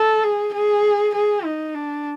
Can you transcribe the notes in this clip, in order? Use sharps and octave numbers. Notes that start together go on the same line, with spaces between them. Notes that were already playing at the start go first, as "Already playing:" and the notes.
Already playing: A4
G#4
G#4
G#4
D#4
D4